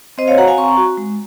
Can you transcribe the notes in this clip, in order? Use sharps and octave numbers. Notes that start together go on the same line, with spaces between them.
C4 C5 D#5
C#5 F5
F#4 F#5 A#5
F5 G#5
C4 A#5 C#6
F#4
G#3